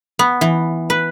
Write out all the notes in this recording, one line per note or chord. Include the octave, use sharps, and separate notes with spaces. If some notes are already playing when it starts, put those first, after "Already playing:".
B3
E3
B4